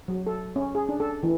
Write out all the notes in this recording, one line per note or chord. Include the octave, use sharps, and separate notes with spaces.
F#3
A4
C#4
G#4
D4
A4
E3